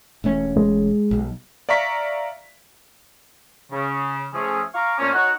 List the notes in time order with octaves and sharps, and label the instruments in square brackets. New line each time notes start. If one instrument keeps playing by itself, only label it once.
[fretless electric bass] E1 A3 C#4
[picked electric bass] G#3
[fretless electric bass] B1
[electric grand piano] D5 E5 F5 A#5 C#6 B6
[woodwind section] C#3
F3 A3 C#4 G#4
F5 A#5 C#6 D6
A#2 A3 A#3 C4 C#4
D#4 F#4 C#5 F#5